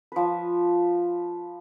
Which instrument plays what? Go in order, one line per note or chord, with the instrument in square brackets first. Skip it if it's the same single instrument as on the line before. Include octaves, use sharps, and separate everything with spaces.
[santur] F3 B4